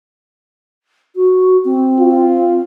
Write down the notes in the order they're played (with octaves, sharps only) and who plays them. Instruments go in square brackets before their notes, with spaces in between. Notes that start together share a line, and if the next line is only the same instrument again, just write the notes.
[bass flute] F#4
C4
[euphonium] F4